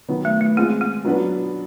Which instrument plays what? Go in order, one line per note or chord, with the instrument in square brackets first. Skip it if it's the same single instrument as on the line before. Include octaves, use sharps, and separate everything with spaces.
[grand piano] D#3 F#3 B3
[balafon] A3
A3
[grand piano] G#3 C4 F4 [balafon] A#3
[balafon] A#3
[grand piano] F#3 B3 D4 F#4 B4